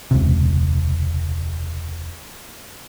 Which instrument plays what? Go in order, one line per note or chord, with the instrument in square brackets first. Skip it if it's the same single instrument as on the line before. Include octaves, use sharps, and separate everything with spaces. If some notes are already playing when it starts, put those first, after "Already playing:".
[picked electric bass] E1 C#2 C3